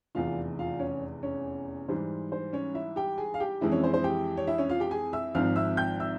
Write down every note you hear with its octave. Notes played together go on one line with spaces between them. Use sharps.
F1 E2 E3 F4 F5
F4 F5
C#4 C#5
C#4 C#5
G#2 E3 G3 C5
C5
C#4 C#5
E4 E5
G4 G5
G#4 G#5
F5
G4 G5
F2 E3 G#3 C4 E4
C#4 C#5
C5
C5
G4 G5
C#5
E4 E5
C#4 C#5
F4 F5
G4 G5
G#4 G#5
E5 E6
G#1 G#2 F3 C4 F5 F6
E5 E6
G5 G6
E5 E6